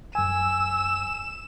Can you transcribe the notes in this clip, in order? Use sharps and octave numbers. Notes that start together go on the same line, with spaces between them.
F#2 G#5 E6 E7